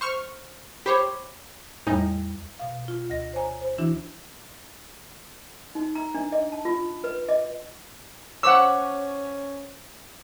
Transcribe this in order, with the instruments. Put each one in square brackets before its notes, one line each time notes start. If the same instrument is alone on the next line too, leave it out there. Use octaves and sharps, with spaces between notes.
[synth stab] C5 C#6 F6
[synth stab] G4 C5 C#5 [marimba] B5 D6
[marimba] E2 G3 [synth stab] A2 D#4
[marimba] B2 F5
F4
D2 D#5 A#6
C5 C#5 G#5 A#5
C5
E3 D4 E4 F#4
[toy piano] D#4
A#5
D4
D#5
A5
F4
B4
D#5
[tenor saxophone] C#4 [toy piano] C5 C#6 D6 [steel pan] F#5 E6